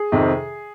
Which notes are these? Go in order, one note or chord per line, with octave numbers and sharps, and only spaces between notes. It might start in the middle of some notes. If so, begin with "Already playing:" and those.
Already playing: G#4
F2 C3 D#3